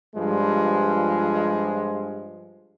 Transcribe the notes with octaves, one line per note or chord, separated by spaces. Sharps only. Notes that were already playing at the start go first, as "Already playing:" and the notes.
G2 F3 G3 G#3